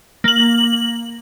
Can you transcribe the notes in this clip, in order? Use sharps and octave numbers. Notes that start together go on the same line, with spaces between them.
A#3 F#7